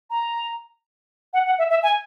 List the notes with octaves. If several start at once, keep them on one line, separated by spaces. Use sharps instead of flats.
A#5
F#5
F#5
E5
E5
G#5